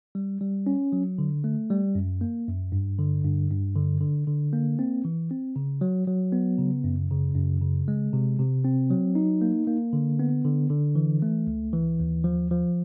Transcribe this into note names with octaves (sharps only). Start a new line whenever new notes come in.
G3
G3
C#4
F#3
D3
A3
G3
F#2
A#3
F#2
G2
D3
G2
G2
D3
D3
D3
A#3
C4
E3
C4
C#3
F#3
F#3
B3
C#3
F#2
C#3
F#2
C#3
G#3
C3
C3
C4
F#3
D#4
A#3
A#3
D3
B3
D3
D3
E3
A3
C#2
E3
D#2
F3
F3